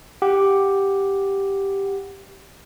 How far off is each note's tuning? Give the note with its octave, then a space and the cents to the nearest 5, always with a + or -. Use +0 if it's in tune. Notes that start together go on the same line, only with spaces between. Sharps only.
G4 +0 F#5 +0